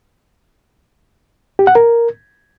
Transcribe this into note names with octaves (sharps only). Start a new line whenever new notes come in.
G4
F#5
A#4